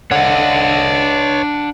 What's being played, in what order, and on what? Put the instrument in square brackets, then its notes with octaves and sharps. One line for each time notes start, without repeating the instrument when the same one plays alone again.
[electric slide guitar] D4 F#5 [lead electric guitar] C#5 D#5